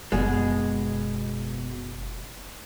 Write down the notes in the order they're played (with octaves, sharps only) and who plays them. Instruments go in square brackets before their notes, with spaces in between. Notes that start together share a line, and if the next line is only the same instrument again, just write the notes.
[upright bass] F#1 [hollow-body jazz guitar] B2 G#3